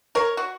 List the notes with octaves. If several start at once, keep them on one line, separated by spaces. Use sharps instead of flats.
A#4 C#5
F#4